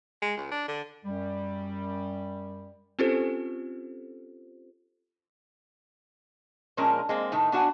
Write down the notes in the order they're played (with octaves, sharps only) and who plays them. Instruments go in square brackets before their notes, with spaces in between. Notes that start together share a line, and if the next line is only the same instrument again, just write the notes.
[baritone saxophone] G#3
C#2
D4
D3
[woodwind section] F#2 G3
[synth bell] C4 C#4 F4 G4 A4 C5
[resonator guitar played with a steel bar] A#2 F3 G#3 C#4 D4 A#4
G#3 A#3 C4
A2 D#3 D#4
B3 D4 F#4 F5 F#5 G#5